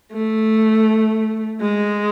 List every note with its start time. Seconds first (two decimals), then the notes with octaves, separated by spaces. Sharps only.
0.12 A3
1.61 G#3